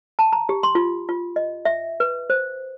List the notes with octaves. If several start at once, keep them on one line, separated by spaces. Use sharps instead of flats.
A5
A#5
G4
C6
F4
F4
D#5
E5
B4
C5